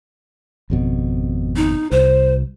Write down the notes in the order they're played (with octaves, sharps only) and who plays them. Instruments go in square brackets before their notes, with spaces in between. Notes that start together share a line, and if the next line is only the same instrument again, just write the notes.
[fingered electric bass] G#1 F2 B2
[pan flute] D#4
[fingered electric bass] C2 [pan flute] C5